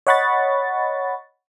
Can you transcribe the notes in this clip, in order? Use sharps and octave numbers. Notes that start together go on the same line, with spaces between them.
C#5 D#5 F#5 B5 C#6 A6